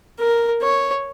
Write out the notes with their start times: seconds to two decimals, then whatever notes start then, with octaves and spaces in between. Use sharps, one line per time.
0.19 A#4
0.62 C#5